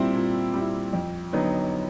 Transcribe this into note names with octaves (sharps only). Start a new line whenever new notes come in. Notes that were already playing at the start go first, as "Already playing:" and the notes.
Already playing: A#2 G3 C4 E4
A#2
G3 C4 E4
F2
D3 F#3 B3 D#4